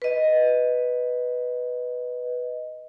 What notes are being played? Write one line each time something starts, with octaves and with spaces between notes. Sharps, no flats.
B4 D#5